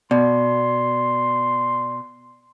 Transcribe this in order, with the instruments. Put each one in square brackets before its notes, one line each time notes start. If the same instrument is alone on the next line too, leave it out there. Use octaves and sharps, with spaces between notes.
[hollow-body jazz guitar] B2 [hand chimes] D5 [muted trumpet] C6